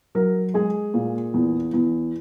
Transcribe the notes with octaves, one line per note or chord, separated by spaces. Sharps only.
F#3 A#4
G#3 G#4
A#2
E2
E2